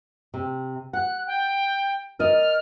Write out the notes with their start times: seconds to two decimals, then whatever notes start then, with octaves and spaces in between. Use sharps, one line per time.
0.34 C3
0.93 F#5 F#6
1.27 G5
2.19 A#4 D5 D#5 F6